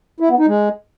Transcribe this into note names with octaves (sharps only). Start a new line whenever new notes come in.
E4
B3
D#4
G#3